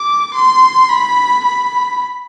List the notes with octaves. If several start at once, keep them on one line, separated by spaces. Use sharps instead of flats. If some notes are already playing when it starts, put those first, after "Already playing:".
Already playing: D6
C6
B5
B5